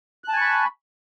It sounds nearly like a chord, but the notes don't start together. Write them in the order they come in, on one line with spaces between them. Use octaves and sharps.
F#6 A5 G#5 C#6 B5